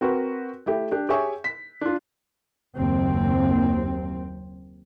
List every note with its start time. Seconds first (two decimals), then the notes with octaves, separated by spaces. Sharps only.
0.01 C4 F#4 A#4 B4
0.66 A3 E4 G4
0.91 D4 G4
1.09 G4 G#4 C#5 E5 G#5 C#6
1.44 B6
1.81 D4 F4
2.76 F#1 D#2 C4